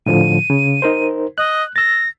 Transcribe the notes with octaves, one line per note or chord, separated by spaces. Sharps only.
A2 D3 F3 D#7
C#3
D#4 A#4 C5
D#5 F#6
E6 A6 A#6